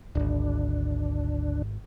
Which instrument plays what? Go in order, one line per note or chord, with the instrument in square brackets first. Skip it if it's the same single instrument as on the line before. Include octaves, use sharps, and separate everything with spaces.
[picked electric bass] D1 G#1 [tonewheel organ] D2 D4